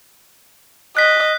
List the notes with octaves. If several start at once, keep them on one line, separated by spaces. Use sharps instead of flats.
D#5 F#6 B6